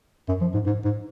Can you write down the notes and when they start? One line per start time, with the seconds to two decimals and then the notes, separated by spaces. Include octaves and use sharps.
0.29 F#2
0.41 F3
0.54 G#2
0.66 G#2
0.85 G#2